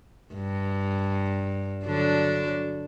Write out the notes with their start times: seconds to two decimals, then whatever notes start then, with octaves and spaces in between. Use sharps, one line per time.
0.34 G2
1.85 D3 F#3 D4